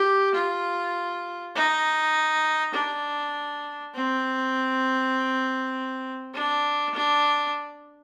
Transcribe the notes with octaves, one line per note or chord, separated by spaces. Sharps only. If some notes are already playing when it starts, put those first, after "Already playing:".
Already playing: G4
F4
D#4
D4
C4
D4
D4